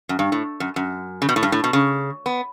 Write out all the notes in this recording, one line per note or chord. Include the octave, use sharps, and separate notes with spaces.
F#2
G2
A2
F#2
F#2
C#3
B2
A2
G2
A2
B2
C#3
B3